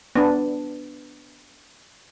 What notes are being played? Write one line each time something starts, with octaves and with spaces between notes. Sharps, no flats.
B3 D4